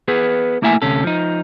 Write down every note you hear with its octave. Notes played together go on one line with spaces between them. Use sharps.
B3 G#4 B4
A3 A#3 E4 E5 G5 G#5
D2 C3 C#4 A4
F3 D#4